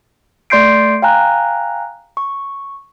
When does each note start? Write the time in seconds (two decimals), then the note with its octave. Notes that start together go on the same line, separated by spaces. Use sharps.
0.50 A3 D5 C6 G6 C7 D7
1.02 F5 G5 G#5 A#5 F#6
2.17 C#6